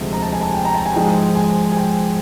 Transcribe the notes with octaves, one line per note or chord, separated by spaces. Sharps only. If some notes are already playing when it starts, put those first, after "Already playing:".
Already playing: D2 C3 F3 G#3
A#5
A5
G#5
A5
G5
A#5
A5
G#5
G#2 F3 G#3 G5
G#5
G#5
G5